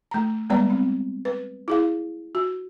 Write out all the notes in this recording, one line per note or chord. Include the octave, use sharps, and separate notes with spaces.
A3 A#5
G3 G#3 B3 B4 D5 A#5
C4
B4
E4 G#4 F5
F#4